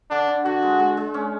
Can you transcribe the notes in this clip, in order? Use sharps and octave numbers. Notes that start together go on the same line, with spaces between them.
D3 D4
D3
D3 F#4
G#3
G#3
G#3
C#4